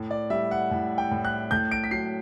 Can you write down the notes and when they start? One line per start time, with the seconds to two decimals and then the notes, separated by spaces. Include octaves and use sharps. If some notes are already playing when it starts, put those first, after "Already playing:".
Already playing: A2
0.11 D5
0.30 G3 E5
0.51 F#5
0.71 A2
0.98 G5
1.11 A2
1.25 F#6
1.51 A2 G6
1.71 D7
1.84 B6
1.91 F#3 C7